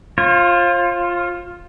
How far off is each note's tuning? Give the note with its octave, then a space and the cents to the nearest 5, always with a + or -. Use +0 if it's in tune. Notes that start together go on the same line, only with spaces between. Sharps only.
F4 +0 C5 +45